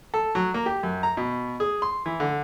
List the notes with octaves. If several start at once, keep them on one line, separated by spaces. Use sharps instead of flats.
A4
F#3
A#3
G4
F#2
A#5
B2
G#4
C6
E3
D3